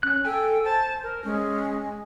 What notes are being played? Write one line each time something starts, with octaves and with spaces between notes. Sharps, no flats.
C#4 F#6
A4 G5 G#5
C5 A5
A#4
G#3 C#4